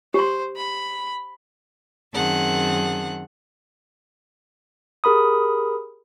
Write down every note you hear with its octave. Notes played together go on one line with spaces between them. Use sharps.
G4 C5 C6
B5
F#2 D#3 C4 G#4 F#5 A5
G4 G#4 A#4 B5 D#6